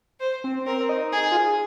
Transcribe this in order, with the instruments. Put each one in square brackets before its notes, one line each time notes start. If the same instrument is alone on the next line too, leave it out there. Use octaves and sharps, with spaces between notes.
[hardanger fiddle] C5
[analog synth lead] C4
[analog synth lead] C4 [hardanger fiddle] A#4
[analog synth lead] C4
D#4
[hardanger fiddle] G#4
[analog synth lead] F4
G#4